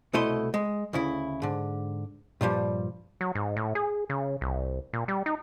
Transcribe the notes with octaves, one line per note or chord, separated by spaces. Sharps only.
C2 B2 A3 E4 D#5 C6
G#3
D2 C#3 E4
G#2 D3
G2 A#2 F3 G3
F#3
G#2
A2
G#4
C#3
C2
A#2
G3
D#4